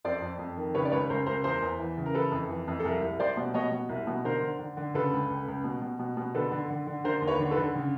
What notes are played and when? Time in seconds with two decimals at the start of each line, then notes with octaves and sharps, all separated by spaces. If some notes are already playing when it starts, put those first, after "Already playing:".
0.04 F2 C5 D5
0.22 F2
0.39 F2
0.57 D#3
0.75 C#3 B4 C#5
0.85 D5
0.92 C#2 B4 C#5
1.10 C#2 A#4 C5
1.26 C#2 A#4 C5
1.44 E2 A#4 C5
1.62 E2
1.79 E3
1.97 C#3
2.06 A#4
2.14 E3 A4 B4
2.32 F2
2.49 E3
2.67 F2
2.80 A4
2.84 C2 G#4 A#4
3.01 C2
3.19 C2 C5 D5
3.37 B2
3.54 B2 C#5 D#5
3.72 B2
3.89 C2
4.07 B2
4.24 D3 A#4 C5
4.42 D3
4.59 D3
4.77 D3
4.94 C#3 A4 B4
5.13 C#2
5.30 C#2
5.48 C#2
5.64 B2
5.82 B2
5.99 B2
6.17 B2
6.35 D3 A4 B4
6.52 D3
6.70 D3
6.87 D3
7.04 D3 A#4 C5
7.22 D#2
7.27 B4 C#5
7.39 D3
7.51 A4 B4
7.57 D3
7.75 C#3